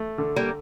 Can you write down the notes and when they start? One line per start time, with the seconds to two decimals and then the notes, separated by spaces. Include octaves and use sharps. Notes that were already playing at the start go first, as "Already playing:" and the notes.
Already playing: A3
0.18 D3
0.36 G3 A#3